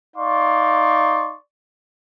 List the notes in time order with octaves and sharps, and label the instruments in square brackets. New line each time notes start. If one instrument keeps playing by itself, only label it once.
[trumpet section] D#4 D5 F5 C6 C#6